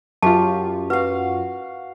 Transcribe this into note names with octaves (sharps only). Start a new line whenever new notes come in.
F#2 F4 G4 A5 C#6
F#4 B4 F5